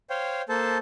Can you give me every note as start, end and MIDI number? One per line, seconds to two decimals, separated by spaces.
0.10 0.42 72
0.10 0.42 73
0.10 0.42 77
0.10 0.42 79
0.49 0.78 58
0.49 0.78 69
0.49 0.78 72
0.49 0.78 81